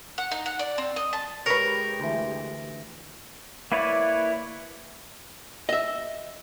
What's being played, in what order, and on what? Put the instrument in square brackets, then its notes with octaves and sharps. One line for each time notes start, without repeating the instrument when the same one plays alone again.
[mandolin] F#5
D#4
F#5
D5
C4
D#5
A5
[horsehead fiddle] G#3 G4 [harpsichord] A#4 [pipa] B4 C#5
[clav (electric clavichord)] D2 E3
[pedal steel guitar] A#3 E4 B4 C#5 D5
[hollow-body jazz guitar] D#5 E5